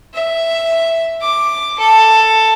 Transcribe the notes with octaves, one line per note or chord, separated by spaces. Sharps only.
E5
D6
A4